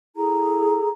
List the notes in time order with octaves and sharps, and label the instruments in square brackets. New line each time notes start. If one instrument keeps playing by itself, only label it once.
[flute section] E4 G#4 A4 A#5